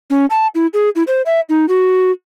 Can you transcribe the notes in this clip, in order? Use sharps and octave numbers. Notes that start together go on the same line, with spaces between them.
C#4
A5
E4
G#4
E4
C5
E5
D#4
F#4